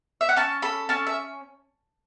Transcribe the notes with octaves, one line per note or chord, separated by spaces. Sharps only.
E5
F#5
C#4 A5
A4 B5
C#4 A5
E5